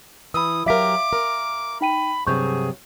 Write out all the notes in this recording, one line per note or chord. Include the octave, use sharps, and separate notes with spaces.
E3 B5 D#6 E6
F#3 G4 A#4 E5 F5 D6 B6
A#4
D#4 G5 B5 D#7
G2 C3 F#3 G#4 C#6 G6